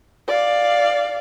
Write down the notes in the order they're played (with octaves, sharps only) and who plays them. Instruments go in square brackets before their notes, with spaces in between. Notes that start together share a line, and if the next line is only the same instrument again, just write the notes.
[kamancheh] D5 F5